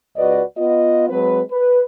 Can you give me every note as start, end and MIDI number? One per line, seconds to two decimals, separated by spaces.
0.17 0.41 37
0.17 0.41 66
0.17 0.41 71
0.17 0.41 74
0.17 0.41 75
0.57 1.07 59
0.57 1.07 65
0.57 1.07 75
1.10 1.41 54
1.10 1.41 56
1.10 1.41 60
1.10 1.41 71
1.51 1.82 71